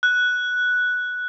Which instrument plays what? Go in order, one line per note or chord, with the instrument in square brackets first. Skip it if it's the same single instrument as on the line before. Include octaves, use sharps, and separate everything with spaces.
[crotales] F#6